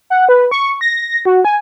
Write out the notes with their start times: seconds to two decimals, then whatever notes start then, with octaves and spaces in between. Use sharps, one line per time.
0.10 F#5
0.29 B4
0.51 C#6
0.81 A#6
1.25 F#4
1.45 G#5